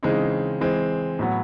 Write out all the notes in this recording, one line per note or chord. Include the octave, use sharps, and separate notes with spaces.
C#3 E3 G#3 C4 D#4
E3 G#3 C4
A2 F#3 B3